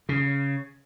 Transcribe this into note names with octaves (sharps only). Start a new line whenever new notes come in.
C#3